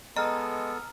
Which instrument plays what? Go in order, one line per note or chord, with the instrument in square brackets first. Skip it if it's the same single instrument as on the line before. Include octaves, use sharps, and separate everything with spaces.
[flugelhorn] G#3 [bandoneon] B3 A4 [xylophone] D#5 [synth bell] A#5 F6